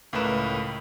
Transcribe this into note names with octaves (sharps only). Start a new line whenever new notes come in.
C#2 A2 A3 A#4 B4 E7